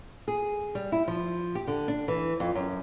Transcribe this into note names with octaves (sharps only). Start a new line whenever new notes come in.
G#4
G3
E4
F3
G4
D3
D4
E3
F2
F#2